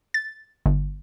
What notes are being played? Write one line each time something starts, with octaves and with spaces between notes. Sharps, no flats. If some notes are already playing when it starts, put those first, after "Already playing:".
A6
G1